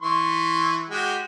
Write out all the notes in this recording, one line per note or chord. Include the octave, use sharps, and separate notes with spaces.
E3 C6 C#6
G#3 F#4 G4